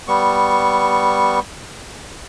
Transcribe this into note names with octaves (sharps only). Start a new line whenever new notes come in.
G3 B3 C#6